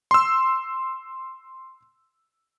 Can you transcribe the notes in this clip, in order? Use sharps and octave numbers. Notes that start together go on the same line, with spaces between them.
C6 E6